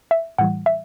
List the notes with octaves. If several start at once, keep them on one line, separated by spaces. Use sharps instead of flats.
E5
A2 E3 G3 F#5
E5